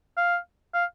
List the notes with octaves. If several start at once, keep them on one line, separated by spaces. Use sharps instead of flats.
F5
F5